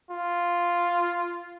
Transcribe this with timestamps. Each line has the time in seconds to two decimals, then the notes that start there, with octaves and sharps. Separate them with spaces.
0.11 F4